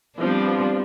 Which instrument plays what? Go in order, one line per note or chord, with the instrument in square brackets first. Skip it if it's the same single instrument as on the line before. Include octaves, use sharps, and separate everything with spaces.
[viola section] F3 B3 [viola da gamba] G3 C4 D4